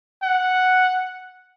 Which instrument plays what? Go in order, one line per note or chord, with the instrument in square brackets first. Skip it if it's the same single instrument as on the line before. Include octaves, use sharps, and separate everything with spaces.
[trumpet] F#5